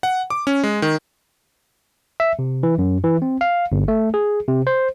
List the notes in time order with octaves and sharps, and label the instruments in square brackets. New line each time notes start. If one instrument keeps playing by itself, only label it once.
[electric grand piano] F#5
D6
C#4
G#3
D#3
[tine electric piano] E5
C3
E3
F#2
E3
C4
F5
G1
A3
G#4
C3
C5